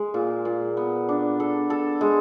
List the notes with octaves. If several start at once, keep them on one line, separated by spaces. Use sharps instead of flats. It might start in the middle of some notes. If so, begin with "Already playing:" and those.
Already playing: G#3
A#2
A#2
B3
D4
A4
A4
G#3